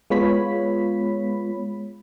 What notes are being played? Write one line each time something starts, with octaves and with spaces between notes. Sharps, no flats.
G#3 B3 F4 C#5 B5 B6